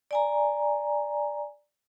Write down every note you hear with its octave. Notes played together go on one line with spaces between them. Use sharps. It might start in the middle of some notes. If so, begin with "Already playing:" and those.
D5 G#5 A#5